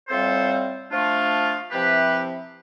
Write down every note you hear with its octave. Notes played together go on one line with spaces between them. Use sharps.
A2 G3 C4 F4 A4 C5
F3 A3 D4 F4
C3 F3 C4 E4 G4 B4